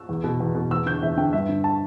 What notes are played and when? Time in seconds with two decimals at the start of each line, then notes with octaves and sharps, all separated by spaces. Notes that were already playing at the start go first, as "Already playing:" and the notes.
Already playing: E6
0.09 E2
0.24 B2
0.40 E2
0.55 B2
0.71 E2 E6
0.86 D3 G6
1.02 E2 E5
1.17 D3 G5
1.33 G2 E5
1.49 D3
1.64 A5